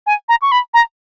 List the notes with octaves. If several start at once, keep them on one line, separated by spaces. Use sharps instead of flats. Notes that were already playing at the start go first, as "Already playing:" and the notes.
G#5
A#5
C#6
B5
A#5